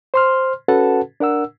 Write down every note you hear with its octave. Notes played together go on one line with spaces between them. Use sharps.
C5 C6 F6
C#4 F#4 A4 B4 F#5 A5
D4 A#4 F#5 E6